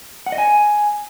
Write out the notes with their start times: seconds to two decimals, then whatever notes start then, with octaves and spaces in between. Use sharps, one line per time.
0.26 F#5
0.32 D#5
0.38 G#5